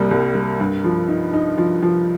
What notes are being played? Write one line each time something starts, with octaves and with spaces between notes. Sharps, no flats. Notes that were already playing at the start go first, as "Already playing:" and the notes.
Already playing: C2 C3 G3 A#3
C2
G3
G2
F3
D#4
D#4
F3
F3